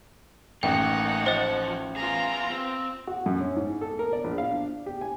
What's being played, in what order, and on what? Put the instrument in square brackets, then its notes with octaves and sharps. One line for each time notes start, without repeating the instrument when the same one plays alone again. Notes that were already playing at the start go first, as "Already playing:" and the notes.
[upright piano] A1 [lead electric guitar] A3 A#3 [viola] D#4 F#5 [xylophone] G5
[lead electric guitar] F3 [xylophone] C5 D#5
[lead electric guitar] B3 G#4 [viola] F4 A#5
[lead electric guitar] C4
[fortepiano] F#4
F#2
C#4
G#2
A4
A#4
D5
A#1
F5
D4
G4
G#5